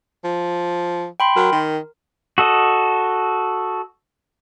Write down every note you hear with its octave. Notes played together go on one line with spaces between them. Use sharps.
F3
G5 B5 C6
F#3 A#4
D#3
F#4 A4 D#5